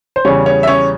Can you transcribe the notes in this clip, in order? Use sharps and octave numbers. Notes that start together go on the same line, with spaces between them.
C5
E2 C#3 G3 C#4 C#5
C#4 C#5
E5
C#4 C#5